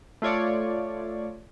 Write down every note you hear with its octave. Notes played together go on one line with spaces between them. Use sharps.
A3 F4 C#5 D5